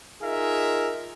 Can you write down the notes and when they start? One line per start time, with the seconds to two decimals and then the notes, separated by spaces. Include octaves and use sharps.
0.22 D#4 F4 G#4 A#4 E5